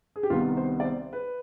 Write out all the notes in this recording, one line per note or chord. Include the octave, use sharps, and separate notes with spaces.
G#4
G4
C2 C3 D#3 B3 F4
C5
D5
C5
B4